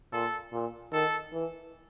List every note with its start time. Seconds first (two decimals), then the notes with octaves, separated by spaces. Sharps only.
0.12 A#2 A4
0.53 A#2
0.92 D#3 A4
1.33 E3